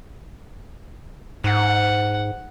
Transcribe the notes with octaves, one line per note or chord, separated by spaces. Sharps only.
G#2 F#5